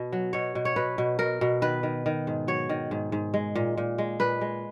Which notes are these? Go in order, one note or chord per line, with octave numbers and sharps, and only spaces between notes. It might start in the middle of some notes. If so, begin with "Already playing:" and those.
Already playing: B2
F#3
B2 C#5
B2
C#5
B2 B4
B2
B2 A#4
B2
D#3 B4
D#3
D#3
G#2
F#3 C#5
D#3
G#2
G#2
G#3
A#2
A#2
G#3
A#2 B4
G#3